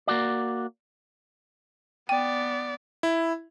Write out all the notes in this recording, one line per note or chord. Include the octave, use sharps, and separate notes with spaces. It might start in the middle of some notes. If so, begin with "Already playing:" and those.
A#3 F#4 D5
B3 D5 G5
E4